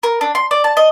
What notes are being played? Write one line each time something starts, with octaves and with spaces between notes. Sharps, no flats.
A#4
D4
C6
D5
A5
D#5